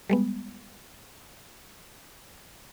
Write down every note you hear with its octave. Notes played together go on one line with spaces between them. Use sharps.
G3 G#3 B3